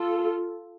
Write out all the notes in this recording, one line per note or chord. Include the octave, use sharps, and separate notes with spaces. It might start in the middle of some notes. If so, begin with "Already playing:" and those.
Already playing: F4 A4